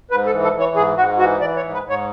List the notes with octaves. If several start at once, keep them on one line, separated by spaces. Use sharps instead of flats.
G#2 B4
A4
E3
A4
E3
C#5
G#2 G#4
G#2 F#4
E3 F#4
E3 D5
C#5
G#2
B4
G#2 C#5